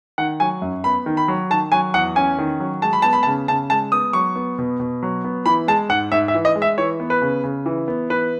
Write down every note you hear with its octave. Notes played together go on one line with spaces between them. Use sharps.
D#3 F#5
F#3 G#5
F#2
B3 B5
D#3
B5
F#3
D#3 A5
F#3 G#5
E2 F#5
C#4 G#5
D#3
F#3
G#3 A5
B5
B3 A5
B5
A5
C#3
C#3 A5
G#3 A5
B3 D#6
F#3 C#6
B3
B2
B2
F#3
B3
E3 B5
G#3 A5
G#2 F#5
G#2 E5
E5
E3
D#5
G#3
E5
E3 C#5
B3
B4
C#3
C#3
E3
B3
E3 B4